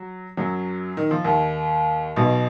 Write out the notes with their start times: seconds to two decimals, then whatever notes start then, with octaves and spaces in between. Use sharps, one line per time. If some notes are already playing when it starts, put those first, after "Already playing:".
Already playing: F#3
0.37 F#2 F#3
0.97 D#3
1.11 F3
1.24 D#2 D#3
2.16 B1 B2